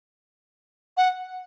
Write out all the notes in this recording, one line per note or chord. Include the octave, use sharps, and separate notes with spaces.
F#5